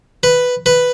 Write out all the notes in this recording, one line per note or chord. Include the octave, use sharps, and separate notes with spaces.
B4
B4